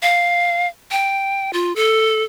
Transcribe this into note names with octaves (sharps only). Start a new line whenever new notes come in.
F5
G5
F4
A4